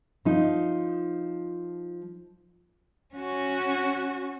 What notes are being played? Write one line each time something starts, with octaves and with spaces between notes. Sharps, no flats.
F3 D#4
C#4 F#4